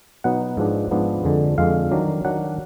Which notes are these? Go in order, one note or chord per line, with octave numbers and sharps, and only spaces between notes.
B2 F#3 B3 D#4 F#5
G#2 F3 G#3 B3 D4
G#2 F3 G#3 B3 D4
F2 D3 G#3
F2 D3 G#3 F5
D#3 F#3 D4
D#3 F#3 D4 F#5